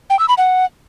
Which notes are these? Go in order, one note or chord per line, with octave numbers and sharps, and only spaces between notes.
G5
E6
B5
F#5